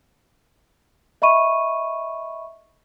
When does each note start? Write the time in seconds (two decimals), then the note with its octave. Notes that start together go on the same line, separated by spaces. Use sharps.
1.22 D#5 E5 B5 C#6 D#7